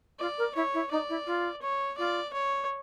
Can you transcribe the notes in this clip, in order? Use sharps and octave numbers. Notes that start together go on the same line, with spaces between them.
F4 D5
A#4
E4 C#5
E4
D#4 D5
E4
F4
C#5
F4 D5
C#5